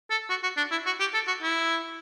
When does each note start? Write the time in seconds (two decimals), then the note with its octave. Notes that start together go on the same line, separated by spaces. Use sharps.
0.10 A4
0.30 F#4
0.43 F#4
0.57 D4
0.71 E4
0.86 F#4
1.00 G4
1.14 A4
1.28 F#4
1.42 E4